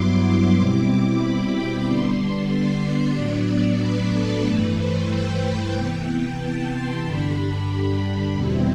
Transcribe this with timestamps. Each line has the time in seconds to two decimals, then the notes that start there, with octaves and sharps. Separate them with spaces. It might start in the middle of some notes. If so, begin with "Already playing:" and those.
Already playing: G2 F#3 B3 E4 C6 D6
0.56 B2 G3 C4 E4
1.20 B5
1.53 G5
1.85 D3 G3 B3 D4 C6
2.50 D5
3.15 A2 F#3 B3 D4
3.80 B4
4.12 A4
4.45 G2 E3 A3 B4
4.77 C5
5.10 G5
5.75 C3 E3 B3
6.39 A5
6.72 C6
7.04 G2 D3 G3 D4 B5
8.34 E2 B2 G3 C4 E4